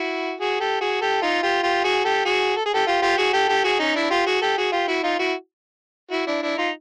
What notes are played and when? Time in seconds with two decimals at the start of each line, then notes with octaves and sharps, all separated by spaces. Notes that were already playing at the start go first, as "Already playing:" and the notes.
Already playing: E4 F#4
0.40 F#4 G#4
0.60 G4 A4
0.81 F#4 G#4
1.01 G4 A4
1.22 D#4 F4
1.43 F4 G4
1.63 F4 G4
1.84 F#4 G#4
2.04 G4 A4
2.25 F#4 G#4
2.57 A4
2.66 G#4
2.74 G4 A4
2.87 F4 G4
3.02 F4 G4
3.18 F#4 G#4
3.33 G4 A4
3.49 G4 A4
3.64 F#4 G#4
3.79 C#4 D#4
3.95 D4 E4
4.10 F4 G4
4.26 F#4 G#4
4.42 G4 A4
4.58 F#4 G#4
4.72 F4 G4
4.88 E4 F#4
5.04 D#4 F4
5.19 E4 F#4
6.11 E4 F#4
6.27 D4 E4
6.42 D4 E4
6.57 D#4 F4